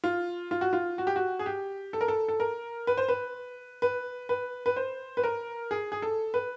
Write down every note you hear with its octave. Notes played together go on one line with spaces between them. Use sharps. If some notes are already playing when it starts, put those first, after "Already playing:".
F4
F4
F#4
F4
F#4
G4
F#4
G#4
G4
A4
A#4
A4
A4
A#4
B4
C5
B4
B4
B4
B4
C5
B4
A#4
G#4
G#4
A4
B4